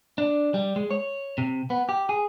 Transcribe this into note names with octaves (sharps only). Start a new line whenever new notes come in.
D4
G3
G#3
C#5
C3
B3
G4
G#4